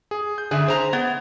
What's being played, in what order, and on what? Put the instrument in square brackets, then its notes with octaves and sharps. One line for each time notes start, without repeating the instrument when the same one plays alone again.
[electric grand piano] G#4
G6
[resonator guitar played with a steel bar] D3 [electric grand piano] G#4 E5
[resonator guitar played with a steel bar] C5 A#5
[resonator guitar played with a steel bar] B3 [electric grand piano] G#6